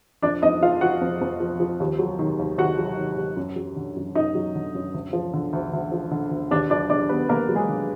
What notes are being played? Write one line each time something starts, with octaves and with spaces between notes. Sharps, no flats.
F2 D4 D5
F2 D#4 D#5
F3 F4 F5
F3 F#4 F#5
F2
F2
F3
F3
D#2
F#3
D#3
D#2
D#2 F#4 F#5
F#3
D#3
D#2
F#2
F#3
D3
F#2
F#2 D#4 D#5
F#3
D3
F#2
D2
F3
D3
D2
D2
F3
D3
D2
D#2 D4 D5
F#3 D4 D5
D3 D4 D5
D#2 B3 B4
D#2 A#3 A#4
F#3
G#3 G#4
D3